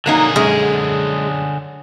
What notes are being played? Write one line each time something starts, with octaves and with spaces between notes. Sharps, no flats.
D3 F#3 A#3 D#4 G#4
F#2 G#3